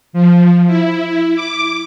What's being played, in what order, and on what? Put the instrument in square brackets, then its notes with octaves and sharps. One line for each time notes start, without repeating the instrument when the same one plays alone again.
[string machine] F3
E4
D6